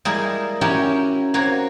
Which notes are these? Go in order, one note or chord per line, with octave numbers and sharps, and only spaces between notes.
G3 G#3 A#3 E4 G#4
C#4 E4 F#4 G4 A#4 C#5
A#3 C4 F#4 C#5